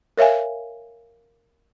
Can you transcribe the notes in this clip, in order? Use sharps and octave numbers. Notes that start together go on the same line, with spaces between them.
A#4 C#5 E5 F5 G#5